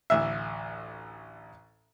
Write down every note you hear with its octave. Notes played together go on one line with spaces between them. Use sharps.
A1 D2 E5